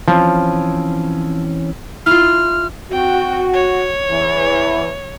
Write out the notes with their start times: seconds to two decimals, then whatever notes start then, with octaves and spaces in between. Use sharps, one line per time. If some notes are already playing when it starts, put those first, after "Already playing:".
0.08 E3 F3 C4 C#4
2.06 E4 F4 F6
2.91 C4 F#4 G5
3.54 C#5
4.08 E2 E3